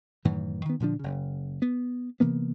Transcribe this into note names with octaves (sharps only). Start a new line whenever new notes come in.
F#2 A2 D#3 E3
D#3 B3
A#2 D3 F3 D4
F#1 C#3
B3
C3 E3 A#3 B3